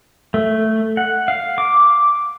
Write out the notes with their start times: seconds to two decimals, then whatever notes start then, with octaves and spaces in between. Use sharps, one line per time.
0.34 A3
0.97 F#5
1.28 F5
1.58 D6